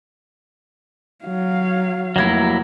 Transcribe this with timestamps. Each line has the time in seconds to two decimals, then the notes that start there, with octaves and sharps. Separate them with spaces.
1.26 F#3 F5
2.16 F1 F#3 A#3 E4 G#6